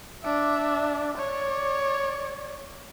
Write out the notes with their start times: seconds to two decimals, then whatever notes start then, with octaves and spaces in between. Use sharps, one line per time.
0.23 D4 E5
1.18 C#5 D5